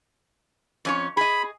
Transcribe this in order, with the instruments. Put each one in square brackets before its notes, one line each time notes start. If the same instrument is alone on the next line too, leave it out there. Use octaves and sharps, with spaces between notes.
[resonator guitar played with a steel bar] F2 C#4 C#5
[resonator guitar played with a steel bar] G#4 D#5 [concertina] B5